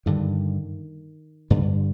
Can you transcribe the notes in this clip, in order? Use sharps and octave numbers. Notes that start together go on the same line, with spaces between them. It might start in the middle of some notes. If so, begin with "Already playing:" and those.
G2 D3 D#3
G2 D3